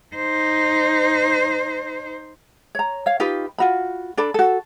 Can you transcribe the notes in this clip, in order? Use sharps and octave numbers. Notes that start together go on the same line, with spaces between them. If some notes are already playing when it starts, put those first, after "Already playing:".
D#4 C5
C#5 A#5
C#5 F5
D#4 F4 G4 B4
F4 F#4 B5
D4 A4 D5 B5
F#4 A4